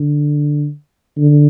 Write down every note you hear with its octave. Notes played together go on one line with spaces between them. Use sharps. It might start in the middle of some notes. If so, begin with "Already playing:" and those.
Already playing: D3
D3